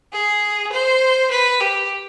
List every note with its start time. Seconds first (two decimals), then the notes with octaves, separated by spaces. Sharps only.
0.12 G#4
0.72 C5
1.31 B4
1.61 G4